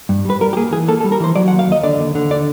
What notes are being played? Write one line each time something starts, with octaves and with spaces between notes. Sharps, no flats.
G2
G3 B4
G3 A#4
G4
A#3 G#4
E3 G#4
A#3 A4
A4
G3
A#4
E3 C5
F#3 D5
F#5
D#2
F5
D#2 D#5
D3 D5
D#2
D3
D5